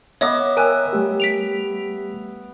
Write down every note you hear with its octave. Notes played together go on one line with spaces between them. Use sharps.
B3 C#5 D#5 E5 D6
A#4 C#5 G5 G#5 E6 F#6
G3 A3 G4
B6 D7 F7